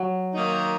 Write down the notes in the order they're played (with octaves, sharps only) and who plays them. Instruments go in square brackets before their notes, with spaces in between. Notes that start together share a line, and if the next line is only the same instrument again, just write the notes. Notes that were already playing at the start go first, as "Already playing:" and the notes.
Already playing: [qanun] F#3
[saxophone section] D#3 A#3 D#4